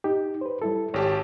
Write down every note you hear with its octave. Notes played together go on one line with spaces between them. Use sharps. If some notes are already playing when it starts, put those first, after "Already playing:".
D#4 G4
B4 C5
G3 E4 A4
G#1 G4 C#5 A5